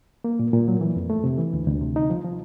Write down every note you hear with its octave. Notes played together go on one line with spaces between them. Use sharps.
A#3
A#2
A#2
F#3
E3
F2
A3
C3
E3
D2
D2
C3
D#4
F3
F3